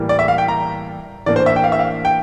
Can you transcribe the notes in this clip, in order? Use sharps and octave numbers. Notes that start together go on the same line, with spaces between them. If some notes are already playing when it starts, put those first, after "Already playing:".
Already playing: A2 E3 G3 A#3
D5
E5
F5
G5
A#5
A2 E3 A#3 D4 D5
C5
E5
G5
F5
E5
F5
G5